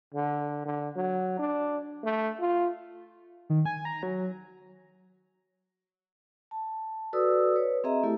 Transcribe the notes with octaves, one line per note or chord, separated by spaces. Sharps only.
D3
D3
F#3
D4
A3
F4
D#3
G#5
A#5
F#3
A5
F#4 A4 B4 D5 D#6 E6
B4 C#5
C4 G#4 D#5 E5 A#5
A3 E4 G4 A4